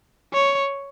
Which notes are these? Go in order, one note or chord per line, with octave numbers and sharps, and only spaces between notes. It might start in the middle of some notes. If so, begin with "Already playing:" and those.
C#5